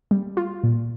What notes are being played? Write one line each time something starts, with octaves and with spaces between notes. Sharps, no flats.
G3
F4
A#2